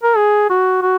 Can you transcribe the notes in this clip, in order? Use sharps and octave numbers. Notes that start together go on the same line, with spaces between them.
A#4
G#4
F#4
F#4